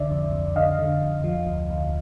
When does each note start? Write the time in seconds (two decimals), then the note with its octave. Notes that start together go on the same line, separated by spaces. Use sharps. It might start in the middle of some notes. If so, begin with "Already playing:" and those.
Already playing: C2 D3 D5 E5
0.11 F2
0.32 F2
0.56 D3 D#5 F5
0.79 D3
1.02 F2
1.24 F3
1.47 D2
1.70 D2